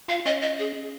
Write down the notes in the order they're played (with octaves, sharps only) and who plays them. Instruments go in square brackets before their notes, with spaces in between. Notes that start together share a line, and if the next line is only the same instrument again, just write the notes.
[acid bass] F4 [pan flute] F5
[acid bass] C#4 [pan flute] D#5
[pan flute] D#5
G#4